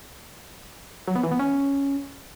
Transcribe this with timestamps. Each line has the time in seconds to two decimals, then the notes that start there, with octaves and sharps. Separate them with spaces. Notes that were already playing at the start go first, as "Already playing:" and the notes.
1.08 F#3
1.16 B3
1.24 E3
1.31 B3
1.39 C#4